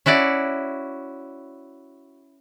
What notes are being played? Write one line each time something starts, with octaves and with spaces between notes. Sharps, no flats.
C#4 E4 F#4 D5